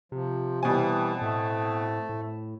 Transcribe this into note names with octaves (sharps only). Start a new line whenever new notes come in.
C3 F3
B2 E3 G3 C4 C5 G#5 A5
A2 A3
A2